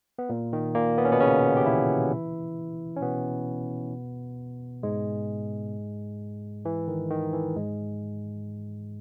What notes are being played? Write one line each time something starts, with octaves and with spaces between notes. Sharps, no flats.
B3
A#2 A#3
D#3
A#2 A#3
B3
C#4
B2 B3
C#3 C#4
G4
E3 E4
C#4
B2 B3
G#2 G#3
E3
D#3
D#3
E3
G#2 G#3